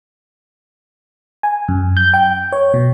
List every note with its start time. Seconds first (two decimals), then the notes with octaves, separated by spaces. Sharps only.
1.43 G#5
1.68 F#2
1.97 G6
2.14 G5
2.52 C#5
2.74 B2